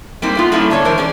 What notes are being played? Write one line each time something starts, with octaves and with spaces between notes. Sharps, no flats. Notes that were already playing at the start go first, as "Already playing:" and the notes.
G3 A#3 C4 D#4
A3 B3 F4
G3 A3 A#3 C#4 E4 A4
D3 D4 A4 C#5
G#2 E3 D4 A#4 C5
C#4 G#4 D5